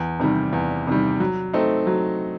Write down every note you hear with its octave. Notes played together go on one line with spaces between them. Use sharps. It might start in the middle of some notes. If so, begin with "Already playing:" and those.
Already playing: E2
C3 D#3 G3
E2
C3 D#3 G3
F#3
A3 C4 D#4
F#3